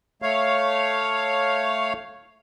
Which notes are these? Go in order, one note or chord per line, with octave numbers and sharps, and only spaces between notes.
A3 C#5 F5